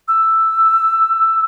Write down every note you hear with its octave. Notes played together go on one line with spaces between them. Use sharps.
E6